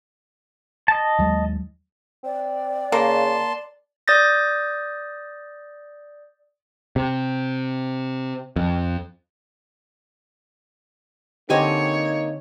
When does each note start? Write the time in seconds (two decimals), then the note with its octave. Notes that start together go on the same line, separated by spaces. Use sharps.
0.88 D#5 A5
1.19 D#2 F#3 G#3
2.24 C4 D5
2.92 C#3 A#3 A5 C6
4.08 D5 D#6 G6 A6 A#6
6.96 C3
8.56 F2
11.50 D3 A#3 C4 D#4 G4 C#5 D#5 G#5